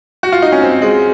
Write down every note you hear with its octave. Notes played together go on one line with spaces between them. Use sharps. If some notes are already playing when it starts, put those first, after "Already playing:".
F#4
F4
D#4
C#4
C4
G#3